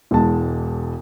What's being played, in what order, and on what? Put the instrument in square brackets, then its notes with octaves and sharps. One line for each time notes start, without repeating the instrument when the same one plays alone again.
[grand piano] E1 E2 G#3 A5